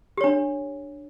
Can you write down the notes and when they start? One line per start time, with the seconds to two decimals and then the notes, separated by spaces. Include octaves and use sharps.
0.17 G4
0.21 C#5
0.24 D4